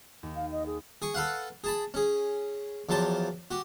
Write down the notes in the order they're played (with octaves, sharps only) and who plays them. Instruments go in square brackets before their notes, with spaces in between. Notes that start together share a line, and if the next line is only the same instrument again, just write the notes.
[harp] D#2
[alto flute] F5
D#5
G#4
[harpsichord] G#4 G#5 C#6
A4 B4 F5 F#5
G#4 A5 B5
C#4 G#4
E2 F3 F#3 G4 A5
F#4 G4